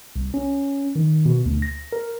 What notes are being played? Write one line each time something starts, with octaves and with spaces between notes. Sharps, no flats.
C2
C#4
D#3
B2
D2
A#6
A#4